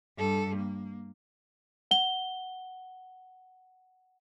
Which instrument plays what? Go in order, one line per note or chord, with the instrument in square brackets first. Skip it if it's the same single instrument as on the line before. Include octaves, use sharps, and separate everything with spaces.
[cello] G2 A4
A#3
[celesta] F#5 G7